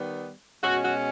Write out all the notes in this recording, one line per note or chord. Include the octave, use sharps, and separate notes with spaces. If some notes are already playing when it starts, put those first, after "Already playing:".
Already playing: D#3 G3 B3
B2 G#3 C#4 F#4
F#4